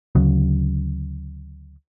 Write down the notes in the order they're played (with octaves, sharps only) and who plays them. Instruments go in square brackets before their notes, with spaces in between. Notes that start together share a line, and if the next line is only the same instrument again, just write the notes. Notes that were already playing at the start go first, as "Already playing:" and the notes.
[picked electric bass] D2 C#3 F#3